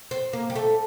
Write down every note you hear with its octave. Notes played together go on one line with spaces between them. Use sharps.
C4
A#3
G3
A3